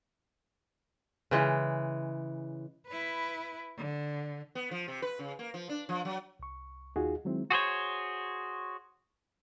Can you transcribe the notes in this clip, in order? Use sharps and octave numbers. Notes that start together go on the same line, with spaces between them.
C#3 E3 G#3
E4 B4
D3
B3
F3
C3
B4
C#3
A#3
F3
D4
F3
F#3
C2 C#6
D#2 D#4 F4 F#4 G#4
D#3 F#3 G#3 C4 E4
F#4 G#4 C5 C#5